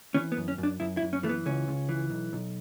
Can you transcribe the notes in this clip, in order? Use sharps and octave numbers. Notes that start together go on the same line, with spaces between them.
E3 C#4
B3
F#2
C#4
F#2
D4
F#2 E4
E4
F#2
C#4
E3 A3
B3
C#2 C#4
C#2
E3
B1
B1